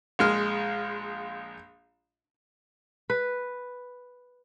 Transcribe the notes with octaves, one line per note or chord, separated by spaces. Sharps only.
A#1 G#3 F6
B4